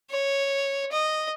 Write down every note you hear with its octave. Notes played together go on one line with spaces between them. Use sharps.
C#5
D#5